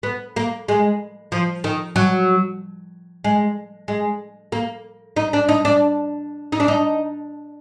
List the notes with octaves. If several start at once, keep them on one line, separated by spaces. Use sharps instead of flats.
B3
A#3
G#3
F3
D#3
F#3
G#3
G#3
A#3
D#4
D4
D#4
D4
D#4
D4
D#4